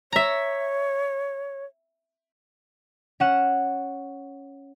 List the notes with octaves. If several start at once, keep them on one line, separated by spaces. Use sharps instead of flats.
C#5 E5 A#5
C#4 F#5 E7